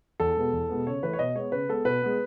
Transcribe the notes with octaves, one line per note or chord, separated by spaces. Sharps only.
E2 A4
B2 G#3 B3
E2
B2 G#3 B3
C#3 C#5
E3 A3 B4
C#5
B2 D#5
G#3 B3 C#5
C#3 B4
G#3 B3 A4
B2 B4
G#3 B3